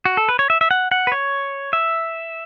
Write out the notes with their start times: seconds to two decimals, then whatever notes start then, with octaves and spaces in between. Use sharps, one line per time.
0.05 F#4
0.17 A4
0.29 B4
0.39 C#5
0.50 E5
0.61 E5
0.71 F#5
0.91 F#5
1.07 B4
1.12 C#5
1.73 E5